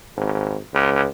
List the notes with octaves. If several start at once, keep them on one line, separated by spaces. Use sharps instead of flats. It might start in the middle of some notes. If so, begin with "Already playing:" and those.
G#1
C#2